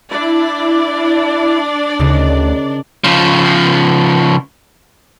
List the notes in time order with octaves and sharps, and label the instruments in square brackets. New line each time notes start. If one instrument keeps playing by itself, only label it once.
[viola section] D4 D5 [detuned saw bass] E4
[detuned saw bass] D2 [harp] C#3 D#4 A#4
[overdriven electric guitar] C#3 F3